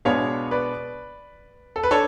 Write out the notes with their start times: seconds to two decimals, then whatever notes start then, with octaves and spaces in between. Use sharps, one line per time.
0.05 B2 G#3 B3 D4 C#5 F5
0.51 B4 D5
1.76 A4
1.83 B4
1.91 D4 A4 C#5